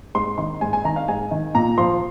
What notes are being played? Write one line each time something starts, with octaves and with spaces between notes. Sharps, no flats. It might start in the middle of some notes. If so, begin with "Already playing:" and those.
G#2 C6
D#3 C6
G#2 G#5
G#5
D#3 A#5
F5
G#2 G#5
D#3
A#2 A#5
F3 C6